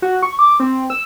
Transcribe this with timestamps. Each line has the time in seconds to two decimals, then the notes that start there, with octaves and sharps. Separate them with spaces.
0.02 F#4
0.23 C#6
0.39 D6
0.60 C4
0.90 E6